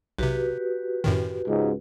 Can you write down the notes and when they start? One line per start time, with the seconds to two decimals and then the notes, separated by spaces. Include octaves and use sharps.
0.19 B1 C3 F#4 G4 B4
1.04 F#2 A2 D#3
1.47 C#2 G#2